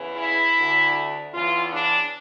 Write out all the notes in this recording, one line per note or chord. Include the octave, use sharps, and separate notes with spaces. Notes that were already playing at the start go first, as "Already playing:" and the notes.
Already playing: E2 C#3 E3
E4
D2 D3
E2 C#3 E3 F4
D4